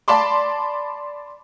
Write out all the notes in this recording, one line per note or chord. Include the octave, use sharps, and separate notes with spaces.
D5 A5 B5 C6 D6